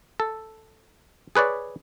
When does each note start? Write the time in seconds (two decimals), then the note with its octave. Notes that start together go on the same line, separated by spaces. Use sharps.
0.20 A4
1.35 G#4 B4 C#5 D5